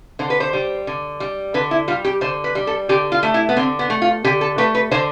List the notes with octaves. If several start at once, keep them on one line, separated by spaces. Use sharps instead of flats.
D3 C5
B4
C5
G3
D3
G3
D3 B4
E4
G3 F4
G4
D3 C5
B4
G3
A4
D3 G4
F4
A3
E4
B3
D3 C4
B3
A3
F4
D3 G4
A4
A3 B4
B4
D3 C5